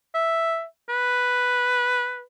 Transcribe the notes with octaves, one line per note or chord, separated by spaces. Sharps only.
E5
B4